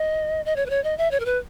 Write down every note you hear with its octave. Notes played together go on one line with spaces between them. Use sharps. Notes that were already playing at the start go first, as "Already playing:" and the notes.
Already playing: D#5
D#5
C#5
B4
C#5
D#5
E5
C#5
A#4
B4